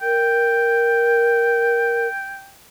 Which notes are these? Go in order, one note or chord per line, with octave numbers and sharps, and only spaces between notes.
A#4 G5